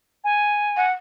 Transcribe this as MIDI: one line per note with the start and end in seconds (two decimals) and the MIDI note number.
0.24 0.86 80
0.77 0.92 78